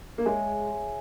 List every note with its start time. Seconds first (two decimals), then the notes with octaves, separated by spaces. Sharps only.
0.18 A#3
0.26 G#3 G#4 C#5 E5 G#5